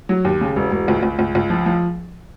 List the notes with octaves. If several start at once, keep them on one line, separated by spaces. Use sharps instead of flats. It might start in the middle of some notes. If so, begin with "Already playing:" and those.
F#3
D#2
C#3
E1
E1
C#2
C#2
C#2
C#2
F3
F3